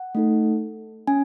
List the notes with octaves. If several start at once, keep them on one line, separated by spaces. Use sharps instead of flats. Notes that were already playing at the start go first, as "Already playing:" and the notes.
Already playing: F#5
A3 D#4 A4
C#4 G#5